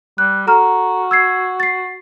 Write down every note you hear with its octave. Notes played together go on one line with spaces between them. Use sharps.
G3 F#6
F#4 A4 A#5 F6
E6 G#6 C7
A6 C7